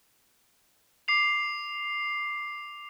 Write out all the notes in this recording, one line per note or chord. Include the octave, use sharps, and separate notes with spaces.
D6 C7 F7